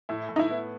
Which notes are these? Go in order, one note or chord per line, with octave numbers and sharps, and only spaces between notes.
A2 E4
A2
D#4
E4
B3